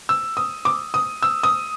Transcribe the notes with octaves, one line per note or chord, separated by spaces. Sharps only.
E6
D#6
D6
D#6
E6
D#6